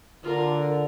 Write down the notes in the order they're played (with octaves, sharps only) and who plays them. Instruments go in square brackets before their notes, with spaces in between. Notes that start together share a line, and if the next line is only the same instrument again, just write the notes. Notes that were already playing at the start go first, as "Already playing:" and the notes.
[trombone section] D3 [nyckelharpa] F4 A#4